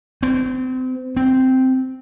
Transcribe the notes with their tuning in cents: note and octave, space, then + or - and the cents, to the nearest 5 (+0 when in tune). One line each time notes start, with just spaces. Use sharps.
C4 -30
C4 -5